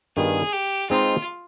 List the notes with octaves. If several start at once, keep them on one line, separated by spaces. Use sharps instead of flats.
G2 D#3 B3 F4 G#4
G4
G#3 C4 D#4 F4 B4